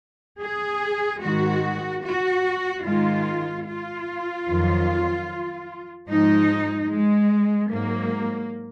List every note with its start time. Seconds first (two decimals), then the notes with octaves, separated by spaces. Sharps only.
0.40 G#4
1.21 G#2 D#3 G#3 F#4
2.03 F#4
2.84 G#2 D#3 G#3 F4
3.66 F4
4.47 F2 D#3 F#3
6.09 G#2 F3 G#3 D#4
6.90 G#3
7.72 G#2 F#3 A#3